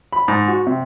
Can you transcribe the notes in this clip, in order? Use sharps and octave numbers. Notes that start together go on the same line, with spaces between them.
B5
G#2
F#4
C3